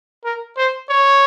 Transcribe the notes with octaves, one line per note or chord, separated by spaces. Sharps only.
A#4
C5
C#5